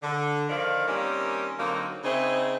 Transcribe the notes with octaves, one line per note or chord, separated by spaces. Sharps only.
D3
D3 D#3 F3 D5 F5
D#3 G3 A#3 C4 C#4
D3 F#3 A#3 C4 D#4
C#3 C4 D#4 E4 G#4